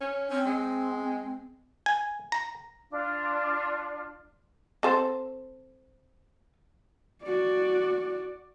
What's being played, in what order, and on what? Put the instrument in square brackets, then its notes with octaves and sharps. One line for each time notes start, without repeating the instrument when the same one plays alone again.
[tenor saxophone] C#4
[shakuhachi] C4 [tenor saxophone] C#4
[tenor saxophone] G#3
[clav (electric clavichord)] G#5
A#5
[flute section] D4 F4
[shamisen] C4 A4 C5
[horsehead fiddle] F#4 D5